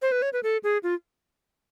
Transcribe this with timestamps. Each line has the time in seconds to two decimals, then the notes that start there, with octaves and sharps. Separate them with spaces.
0.02 C5
0.12 B4
0.22 C#5
0.33 B4
0.43 A4
0.63 G#4
0.83 F4